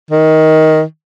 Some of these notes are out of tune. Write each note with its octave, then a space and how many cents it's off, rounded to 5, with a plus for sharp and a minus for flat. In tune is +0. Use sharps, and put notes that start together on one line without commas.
D#3 +15